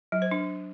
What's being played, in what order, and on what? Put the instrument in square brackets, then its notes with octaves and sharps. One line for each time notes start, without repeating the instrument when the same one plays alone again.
[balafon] F#3
C5
D4